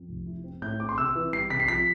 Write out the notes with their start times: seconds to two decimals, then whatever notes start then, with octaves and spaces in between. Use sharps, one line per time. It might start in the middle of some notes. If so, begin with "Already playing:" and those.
Already playing: F2
0.09 F1
0.27 E4
0.44 C4
0.62 A2 G6
0.80 C4 D6
0.89 C6
0.98 C3 E6
1.15 E3
1.33 G3 C7
1.50 C3 B6
1.60 C7
1.68 F3 B6